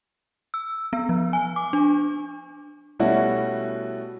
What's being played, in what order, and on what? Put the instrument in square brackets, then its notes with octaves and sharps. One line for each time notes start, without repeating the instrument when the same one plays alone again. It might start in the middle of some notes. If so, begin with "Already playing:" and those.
[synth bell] E6
B3
F3
G#5
D6
D4
[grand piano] B2 G3 A3 C#4 E4 F#4